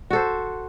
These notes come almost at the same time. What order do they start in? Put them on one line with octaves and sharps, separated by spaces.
F#4 A4 C5